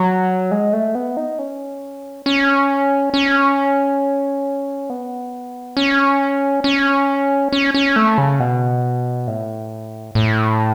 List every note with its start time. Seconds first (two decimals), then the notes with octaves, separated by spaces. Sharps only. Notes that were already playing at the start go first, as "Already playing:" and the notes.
Already playing: F#3
0.51 G#3
0.73 A3
0.95 B3
1.17 D#4
1.39 C#4
2.26 C#4
3.14 C#4
4.90 B3
5.77 C#4
6.64 C#4
7.52 C#4
7.74 C#4
7.96 A3
8.18 C#3
8.40 B2
9.27 A2
10.15 A2